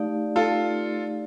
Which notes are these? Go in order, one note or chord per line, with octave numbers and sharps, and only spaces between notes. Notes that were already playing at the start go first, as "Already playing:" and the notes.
Already playing: A3 D#4 G4 D5 F5
F4 A4